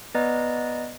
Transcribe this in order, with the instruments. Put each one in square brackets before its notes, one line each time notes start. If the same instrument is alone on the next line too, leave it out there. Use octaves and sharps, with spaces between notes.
[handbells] B3 B4 D5 D#5 A#5